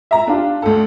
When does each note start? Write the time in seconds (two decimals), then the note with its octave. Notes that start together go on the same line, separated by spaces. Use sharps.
0.11 E5 A#5
0.27 D4 F4 G4
0.62 D2 A4